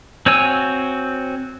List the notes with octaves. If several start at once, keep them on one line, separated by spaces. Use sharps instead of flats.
C4 F#4 C#5 G#5 E6